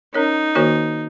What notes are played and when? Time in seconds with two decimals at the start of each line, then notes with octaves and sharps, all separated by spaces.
0.14 C#4 D#4 A#4 C#5
0.55 D#3 A#3 F#4 A#4 C#5